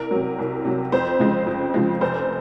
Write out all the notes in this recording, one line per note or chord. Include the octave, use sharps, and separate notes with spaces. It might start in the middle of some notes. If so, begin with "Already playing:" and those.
Already playing: C2 A#4
C3 F#3
C2
C3 F#3
F2 C5
C#3 F3 G#3
F2
C#3 F3 G#3
F1 C5